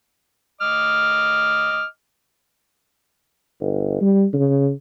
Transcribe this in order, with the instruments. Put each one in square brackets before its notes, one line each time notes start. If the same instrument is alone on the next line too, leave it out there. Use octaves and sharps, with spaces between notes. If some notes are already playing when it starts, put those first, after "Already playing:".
[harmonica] D#5 D6 F6
[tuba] G1
G3
C#3